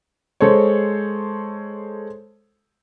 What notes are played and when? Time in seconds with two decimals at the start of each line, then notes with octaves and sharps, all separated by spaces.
0.40 G#3 A4 C5 C#5